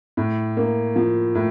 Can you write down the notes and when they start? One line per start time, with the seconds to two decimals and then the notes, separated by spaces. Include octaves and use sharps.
0.17 A2
0.57 A#3
0.96 F3
1.35 A2